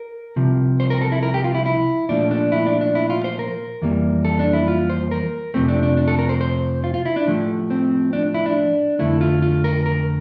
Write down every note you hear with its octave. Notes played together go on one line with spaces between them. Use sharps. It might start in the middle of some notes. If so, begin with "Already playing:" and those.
Already playing: A#4
C2 C3 F3
C5
A#4
A4
E4
A#4
G4
F4
E4
E4
A#2 F3 A3 D4
D4
E4
D4
D4
E4
F4
C5
A#4
F2 E3 G3 A#3
A4
D4
E4
F4
C5
A#4
F2 C3 F3 A3 C4
D4
D4
D4
A4
A#4
C5
C5
F4
F4
E4
D4
A2 F3 A3
C4
D4
E4
D4
F2 D3 A3 E4
F4
F4
A#4
A#4